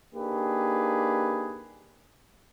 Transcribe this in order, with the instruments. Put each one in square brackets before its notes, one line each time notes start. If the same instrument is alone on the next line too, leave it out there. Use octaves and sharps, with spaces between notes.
[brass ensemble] A#3 D4 D#4 G4 G#4 B4